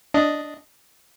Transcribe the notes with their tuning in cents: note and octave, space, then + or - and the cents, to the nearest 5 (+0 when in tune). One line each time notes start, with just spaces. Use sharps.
D4 +0 D#5 +0